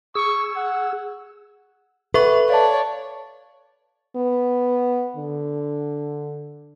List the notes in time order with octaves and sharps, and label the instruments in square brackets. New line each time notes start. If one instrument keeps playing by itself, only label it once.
[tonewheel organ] G#4 E6 [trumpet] C#6
[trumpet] F#5
[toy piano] G4 F#5 [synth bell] A4 E5 C#6 [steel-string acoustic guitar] B4
[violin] C#5 D5 [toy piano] F5 A5
[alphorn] B3
D3